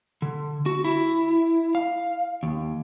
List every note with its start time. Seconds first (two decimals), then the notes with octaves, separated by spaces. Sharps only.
0.22 D3
0.66 F#4
0.85 E4
1.75 F5
2.43 D#2